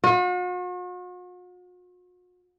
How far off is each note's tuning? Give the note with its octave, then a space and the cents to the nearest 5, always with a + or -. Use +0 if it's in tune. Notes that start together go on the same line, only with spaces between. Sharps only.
F#4 -45